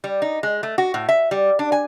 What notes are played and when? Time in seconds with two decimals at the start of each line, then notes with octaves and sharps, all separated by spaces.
0.04 G3
0.22 D#4
0.43 G#3
0.63 A3
0.78 F#4
0.94 A2
1.09 E5
1.31 G3
1.59 D4
1.72 G#5